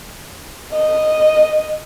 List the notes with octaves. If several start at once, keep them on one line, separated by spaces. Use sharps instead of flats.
D#5